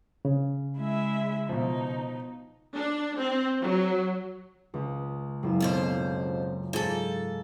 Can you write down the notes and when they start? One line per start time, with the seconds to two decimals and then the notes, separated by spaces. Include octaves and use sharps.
0.25 C#3
0.77 G#3 E4 E5
1.49 B2 F3 D#4
2.75 D4
3.18 C4
3.61 F#3
4.74 C#2
5.43 F#1 F4 E7
5.60 F2 B2 C5
6.73 G#2 F4 A4